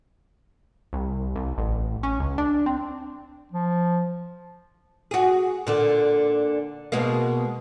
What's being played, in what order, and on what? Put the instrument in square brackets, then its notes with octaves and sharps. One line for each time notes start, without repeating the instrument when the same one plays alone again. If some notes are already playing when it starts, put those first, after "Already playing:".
[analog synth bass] C2
C2
A1
C#4
C#2
D4
C4
[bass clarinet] F3
[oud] F#4 G#4
A#2 D3
B2 G#3 A#3